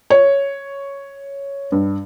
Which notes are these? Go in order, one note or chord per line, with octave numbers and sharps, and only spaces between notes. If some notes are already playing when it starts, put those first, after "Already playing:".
C#5
G2